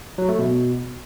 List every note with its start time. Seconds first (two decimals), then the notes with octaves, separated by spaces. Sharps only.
0.18 F#3
0.29 A3
0.39 B2